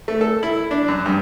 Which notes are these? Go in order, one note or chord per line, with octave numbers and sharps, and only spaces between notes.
A3
A4
E4
D4
F#2
G2